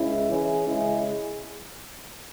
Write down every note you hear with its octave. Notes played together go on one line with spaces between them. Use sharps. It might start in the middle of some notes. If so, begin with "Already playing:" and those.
Already playing: C#2 C#3 G#3 E4
E3 C#4 G#4
C#3 G#3 E4 G#4